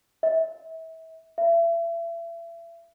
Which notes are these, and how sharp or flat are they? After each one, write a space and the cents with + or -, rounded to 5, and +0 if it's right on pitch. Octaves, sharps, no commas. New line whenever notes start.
E5 -30
E5 +35